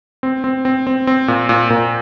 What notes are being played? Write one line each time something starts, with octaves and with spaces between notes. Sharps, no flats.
C4
C4
C4
C4
C4
A#2
A#2
A#2